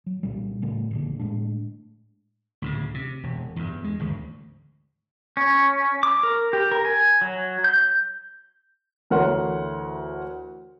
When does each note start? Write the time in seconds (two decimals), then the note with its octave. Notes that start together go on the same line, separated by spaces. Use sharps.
0.06 F#3
0.23 C2 A#2 G3
0.62 A2 C#3 A3
0.91 F1 A#1 D3
1.19 A2 G#3 D4
2.62 D2 A2 C#3
2.94 C3
3.23 E1
3.56 E2 G2
3.84 G#3
4.00 G#1 D2
5.37 C#4
6.03 D6
6.23 A#4
6.53 G4
6.72 A#4
6.85 G#5
7.21 F#3
7.64 G6
9.10 D2 E3 A#4 C#5 F#5 C6